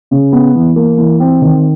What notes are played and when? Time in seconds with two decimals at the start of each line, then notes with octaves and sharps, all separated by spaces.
0.11 C#3
0.32 B3
0.55 E3
0.76 A#3
0.97 E3
1.20 C4
1.42 D#3